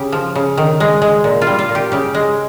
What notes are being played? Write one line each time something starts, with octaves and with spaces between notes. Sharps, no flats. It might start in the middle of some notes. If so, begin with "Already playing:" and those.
Already playing: C#3 G4
F3
C#3
D#3
G#3
G#3
A#2
F4
G3
F4
A#2
G4
C#3 G4
G#3